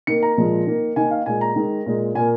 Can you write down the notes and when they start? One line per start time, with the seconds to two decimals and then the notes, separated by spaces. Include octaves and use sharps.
0.07 D#3 A#3 C#7
0.23 A#5
0.37 A#2 F3 G#3
0.67 D#3 A#3
0.96 D#3 A#3 G#5
1.11 F5
1.26 A#2 G#3 G#5
1.41 A#5
1.56 D#3 G#3
1.86 A#2 G#3
2.15 A#2 A#3 G#5